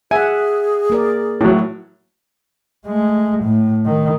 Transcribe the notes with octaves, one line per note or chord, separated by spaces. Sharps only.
G#4 E5 F#5 G#5
A#3 A#4 D5
A2 F#3 E4
G#3 A3
A2
D#3